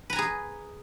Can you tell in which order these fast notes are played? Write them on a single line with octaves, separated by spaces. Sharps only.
B4 A#5 G#5 G#4